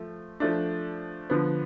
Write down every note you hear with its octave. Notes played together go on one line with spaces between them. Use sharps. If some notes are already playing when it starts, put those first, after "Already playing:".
Already playing: F3 A3
F3 A3 D4
D3 F3 B3